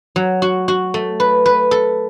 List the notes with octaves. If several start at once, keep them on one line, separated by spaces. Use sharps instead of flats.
F#3
F#4
F#4
A3
B4
B4
A4